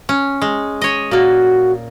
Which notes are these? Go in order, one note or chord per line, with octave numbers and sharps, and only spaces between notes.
C#4
G#3
C#5 D#5
A#2 A#3 F#4